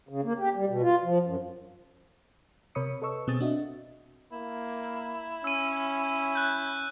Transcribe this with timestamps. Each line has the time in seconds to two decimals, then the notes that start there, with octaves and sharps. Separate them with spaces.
0.09 C#3
0.24 A#3
0.39 G4
0.55 G3
0.69 B2
0.82 F4
1.04 F3
1.26 F#2
2.75 C3 A#4 C#5 B5 D#6 C#7
3.02 A4 B4 D#5 C#6 E6
3.27 B2 C4 G#4 D#6 A6
3.40 D4 F#4 D#5 E5
4.32 A#3 E4
5.44 C#4 E6 D#7
6.35 F#6 G6